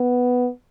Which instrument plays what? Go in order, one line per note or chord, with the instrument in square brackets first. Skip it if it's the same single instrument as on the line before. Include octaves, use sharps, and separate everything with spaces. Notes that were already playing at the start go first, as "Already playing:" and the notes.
Already playing: [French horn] B3